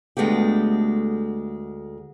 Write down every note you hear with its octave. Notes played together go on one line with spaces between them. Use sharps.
D2 G#3 A3 B3 G4